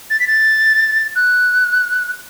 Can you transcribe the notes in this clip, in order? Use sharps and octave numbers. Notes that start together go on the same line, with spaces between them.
A6
B6
A6
F#6